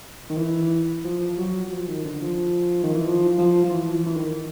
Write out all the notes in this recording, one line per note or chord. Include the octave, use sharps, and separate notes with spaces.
D#3
E3
F3
F#3
F3
D#3
D3
F3
D#3
E3
F3
F3
F3
E3
E3
E3
D#3